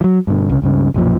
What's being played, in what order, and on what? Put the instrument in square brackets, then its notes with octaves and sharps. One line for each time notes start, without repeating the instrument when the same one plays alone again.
[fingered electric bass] F3 F#3
G2 B2 D3
C2 C#3
C#2 G2 C#3
B1 F#2 A#2 F3